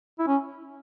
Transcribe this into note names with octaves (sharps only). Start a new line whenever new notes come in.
E4
C#4